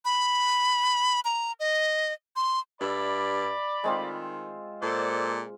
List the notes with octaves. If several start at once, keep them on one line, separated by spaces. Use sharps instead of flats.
B5
A#5
D#5
C6
G2 D5 E5 B5
D#3 G#3 C4 F4
A#2 A4 C5 D5